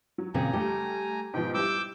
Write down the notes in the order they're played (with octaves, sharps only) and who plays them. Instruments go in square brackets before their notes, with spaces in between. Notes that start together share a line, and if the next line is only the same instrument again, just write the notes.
[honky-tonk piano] F#3
[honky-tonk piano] E2 [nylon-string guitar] A#2 C#3 C4 [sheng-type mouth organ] G#5 A#5
[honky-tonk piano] G3 A3 [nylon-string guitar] G4
[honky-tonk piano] G#2 B2 F3 [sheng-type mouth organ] G5
[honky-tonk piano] G3 E4 [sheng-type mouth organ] D6 E6 G6